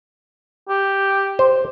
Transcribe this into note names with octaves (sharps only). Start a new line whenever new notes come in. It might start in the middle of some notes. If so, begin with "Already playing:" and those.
G4
C5